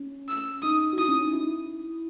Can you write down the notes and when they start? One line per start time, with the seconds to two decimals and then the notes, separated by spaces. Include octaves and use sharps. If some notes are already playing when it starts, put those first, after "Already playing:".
Already playing: C#4
0.28 E6
0.62 D#4 D#6
0.93 F#4
0.97 E4 D#6
1.09 C#4
1.21 D#4
1.33 E4